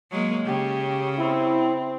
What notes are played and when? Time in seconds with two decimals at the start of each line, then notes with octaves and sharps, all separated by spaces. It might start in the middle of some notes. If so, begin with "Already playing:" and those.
0.11 F#3 G#3 A#3
0.46 C#3 G4
1.18 C4 E4